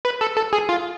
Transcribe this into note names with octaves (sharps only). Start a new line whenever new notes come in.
B4
A4
A4
G#4
F4